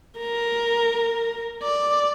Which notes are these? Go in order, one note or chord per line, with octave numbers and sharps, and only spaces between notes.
A#4
D5